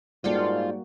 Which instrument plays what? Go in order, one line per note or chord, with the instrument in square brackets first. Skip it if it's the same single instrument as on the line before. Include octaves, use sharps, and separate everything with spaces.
[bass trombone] G#2 [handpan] G3 A#3 F#4 [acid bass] F4 [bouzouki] A4 D5 G5